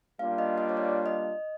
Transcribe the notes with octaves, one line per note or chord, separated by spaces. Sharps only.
G3 A#3 D4 F4 F5
D#5
D#5
C#5
D5
D#5